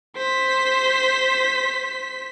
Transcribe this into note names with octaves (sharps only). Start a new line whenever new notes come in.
C5 B6